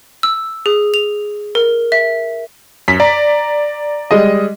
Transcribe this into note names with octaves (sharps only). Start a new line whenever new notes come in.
E6
G#4
F7
A#4
E5
F#2 B6
D5 A#5
G3 G#3 D#5